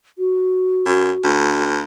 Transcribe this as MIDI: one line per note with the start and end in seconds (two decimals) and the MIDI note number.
0.19 1.26 66
0.86 1.11 42
1.24 1.84 38